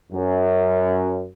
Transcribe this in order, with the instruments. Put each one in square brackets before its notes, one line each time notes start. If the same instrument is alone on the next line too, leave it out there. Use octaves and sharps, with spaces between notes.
[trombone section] F#2